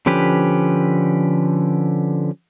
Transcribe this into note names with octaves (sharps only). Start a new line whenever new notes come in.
D3 F3 C#4 G4 B4